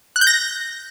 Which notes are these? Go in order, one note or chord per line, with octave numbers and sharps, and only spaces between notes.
F#6
G6
A#6